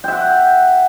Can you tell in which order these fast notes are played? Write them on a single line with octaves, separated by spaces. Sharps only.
G5 E5 F#5